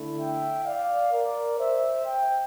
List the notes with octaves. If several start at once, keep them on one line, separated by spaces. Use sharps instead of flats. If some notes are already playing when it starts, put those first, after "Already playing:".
Already playing: D3 A3 E4
E5 G5
D5 F5
A#4 D5
C5 E5
E5 G5